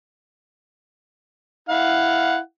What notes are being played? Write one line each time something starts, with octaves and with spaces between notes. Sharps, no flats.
E4 F5 F#5